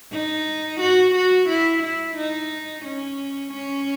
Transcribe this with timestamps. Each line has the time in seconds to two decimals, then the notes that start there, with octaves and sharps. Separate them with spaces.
0.12 D#4
0.81 F#4
1.15 F#4
1.49 E4
1.83 E4
2.17 D#4
2.85 C#4
3.53 C#4